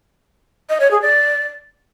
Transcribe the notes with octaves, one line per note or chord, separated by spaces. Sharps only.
D#5
C#5
G#4
D5